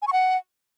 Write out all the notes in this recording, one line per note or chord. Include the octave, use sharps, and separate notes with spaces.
G#5
C#6
F#5